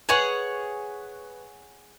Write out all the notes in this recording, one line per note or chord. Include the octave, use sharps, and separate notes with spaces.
G#4 B4 C#5 F#5 C#6